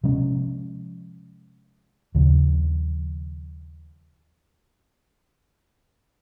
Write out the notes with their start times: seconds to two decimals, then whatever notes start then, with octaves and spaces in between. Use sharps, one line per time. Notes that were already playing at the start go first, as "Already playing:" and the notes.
0.04 C3 F3 G#3 C#4
2.15 D#2 C#3 F3